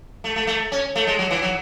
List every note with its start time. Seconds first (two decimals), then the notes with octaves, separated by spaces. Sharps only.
0.24 A3
0.36 A3
0.47 A3
0.72 C#4
0.96 A3
1.07 G#3
1.19 F#3
1.31 E3
1.42 F#3